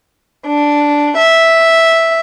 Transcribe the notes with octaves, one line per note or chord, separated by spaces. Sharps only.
D4
E5